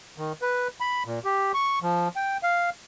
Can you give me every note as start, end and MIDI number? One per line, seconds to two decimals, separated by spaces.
0.18 0.33 51
0.42 0.68 71
0.80 1.03 83
1.06 1.19 46
1.24 1.52 67
1.54 1.79 85
1.82 2.08 53
2.16 2.37 79
2.43 2.70 77